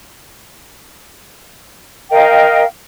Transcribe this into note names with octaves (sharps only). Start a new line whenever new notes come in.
A#4 D#5 F5 G5